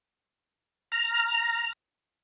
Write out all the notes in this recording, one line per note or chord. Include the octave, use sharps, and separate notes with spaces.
A#5 F6